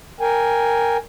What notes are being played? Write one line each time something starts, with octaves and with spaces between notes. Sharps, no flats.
A#4 G5 G#5